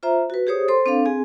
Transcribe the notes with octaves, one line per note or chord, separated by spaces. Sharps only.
F4 C5 E5 A#5
F#4 B4
G4 G#4 C5 C#5 D#6
A4 C5 C6
C4 D4 A4 F5
C4 G#4 G#5